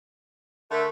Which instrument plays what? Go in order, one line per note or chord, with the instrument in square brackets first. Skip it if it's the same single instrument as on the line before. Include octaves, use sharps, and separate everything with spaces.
[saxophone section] D3 A3 [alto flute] A#4